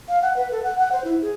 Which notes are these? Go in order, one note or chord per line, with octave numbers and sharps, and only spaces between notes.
F5
F#5
B4
A4
F#5
F#5
C5
E4
G#4